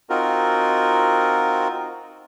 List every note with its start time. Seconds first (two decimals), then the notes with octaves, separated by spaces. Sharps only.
0.10 C4 D#4 F4 F#4 A#4